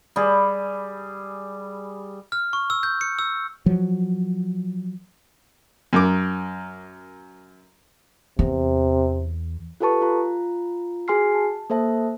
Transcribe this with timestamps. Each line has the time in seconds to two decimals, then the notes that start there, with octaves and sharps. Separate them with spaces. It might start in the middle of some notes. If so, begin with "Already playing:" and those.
0.16 G3 G#4
2.32 F6
2.53 C#6
2.70 E6
2.83 G6
3.01 C#7
3.19 E6
3.66 F3 F#3
5.93 F#2 A#4 D6
8.39 E2 C3
9.80 F4 G4 A4 B4 A5 C#6
10.02 F4 A#5
11.08 F#4 G#4 G#5 C6 F6 C7
11.35 A5
11.70 A#3 A4 C5 E5 A5